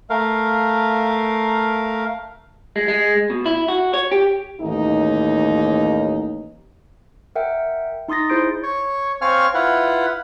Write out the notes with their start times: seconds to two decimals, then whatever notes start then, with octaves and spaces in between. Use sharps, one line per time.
0.10 A3 A#4 F5
2.76 G#3
2.88 G#3
3.30 B2
3.46 E4
3.68 F#4
3.94 C#5
4.12 G4
4.60 A1 D#2 D#4
7.36 A#4 E5 F#5 G5
8.08 D#4 C6 D#6 A6 A#6
8.30 E4 G#4 C5 C6 G6 D7
8.63 C#5
9.21 C4 C#5 F5 G#5 C#6 F6
9.54 E4 F4 B4 F#5